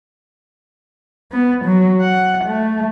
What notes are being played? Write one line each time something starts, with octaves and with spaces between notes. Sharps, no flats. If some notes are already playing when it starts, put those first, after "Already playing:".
B3
F#3
F#5
A3